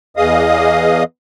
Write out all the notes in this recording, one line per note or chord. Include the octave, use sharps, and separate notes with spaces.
E2 E3 G#4 D#5 F5 D#6